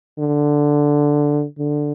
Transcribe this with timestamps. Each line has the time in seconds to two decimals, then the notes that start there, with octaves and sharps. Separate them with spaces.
0.19 D3
1.59 D3